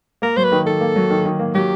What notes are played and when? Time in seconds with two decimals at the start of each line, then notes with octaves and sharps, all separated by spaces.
0.22 A#3 A#4
0.37 F#3 C5
0.44 B4
0.52 D#3
0.66 D#3 A4
0.81 A#3
0.96 F#3
1.10 D#3
1.25 D#3
1.39 A#3
1.55 F#3 G4